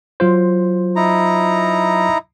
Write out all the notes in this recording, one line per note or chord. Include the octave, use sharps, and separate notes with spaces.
F#3 F4 C5
D#4 E4 A#5